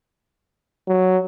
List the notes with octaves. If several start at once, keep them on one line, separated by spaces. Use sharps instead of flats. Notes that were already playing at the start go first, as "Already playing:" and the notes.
F#3